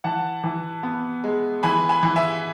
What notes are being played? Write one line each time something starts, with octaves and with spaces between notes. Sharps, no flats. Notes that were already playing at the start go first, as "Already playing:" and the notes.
E3 F#5 A5
E3
B3
G#3
E3 G#5 B5
G#5 B5
E3
E5 G#5